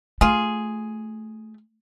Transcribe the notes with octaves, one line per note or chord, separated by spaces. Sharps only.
A3 F4 G#4